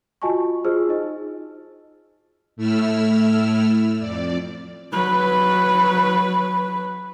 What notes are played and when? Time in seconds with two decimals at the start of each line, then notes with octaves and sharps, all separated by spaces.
0.22 F4 F#4 D#5 G#5 A5 C#6
0.65 F4 G#4 C5 D#5 E6 F6
0.89 D#4 D#5
2.56 A2 A3 E4 E6 F6
3.99 F2 D5
4.93 F#3 B4